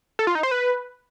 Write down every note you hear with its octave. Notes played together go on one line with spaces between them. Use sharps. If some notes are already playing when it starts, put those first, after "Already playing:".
A4
F4
D#4
C5
B4